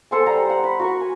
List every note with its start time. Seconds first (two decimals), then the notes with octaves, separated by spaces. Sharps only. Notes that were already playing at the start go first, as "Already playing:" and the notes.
0.11 A4 C5 F#5 G#5
0.26 G3 F#5 A#5
0.46 C5 F#5
0.64 B5
0.79 F#4 A#4 C#6
1.00 G#5